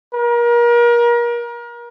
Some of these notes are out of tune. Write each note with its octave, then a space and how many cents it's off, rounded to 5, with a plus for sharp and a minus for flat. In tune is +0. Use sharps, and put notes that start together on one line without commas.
A#4 +35